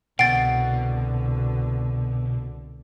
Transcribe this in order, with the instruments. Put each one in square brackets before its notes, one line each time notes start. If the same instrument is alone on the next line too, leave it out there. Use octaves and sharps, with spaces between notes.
[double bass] C2 D3 [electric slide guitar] B2 [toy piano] F#5 [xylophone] A6 D7